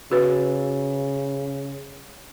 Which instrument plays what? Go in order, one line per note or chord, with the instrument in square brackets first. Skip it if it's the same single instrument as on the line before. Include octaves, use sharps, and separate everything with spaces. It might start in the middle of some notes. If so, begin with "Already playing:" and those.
[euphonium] C#3 [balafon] F#4 B4